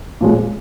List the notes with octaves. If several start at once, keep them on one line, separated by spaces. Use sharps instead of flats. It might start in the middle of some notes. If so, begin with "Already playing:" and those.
A#2 F3 G#3